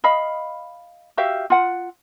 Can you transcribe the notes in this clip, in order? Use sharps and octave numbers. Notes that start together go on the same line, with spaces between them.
D#5 F5 B5
F#4 G4 E5 F5
F4 F#5